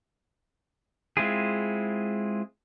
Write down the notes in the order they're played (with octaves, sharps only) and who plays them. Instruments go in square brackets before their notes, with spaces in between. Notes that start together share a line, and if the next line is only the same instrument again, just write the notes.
[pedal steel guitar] G#3 C4 E4 F4 G#4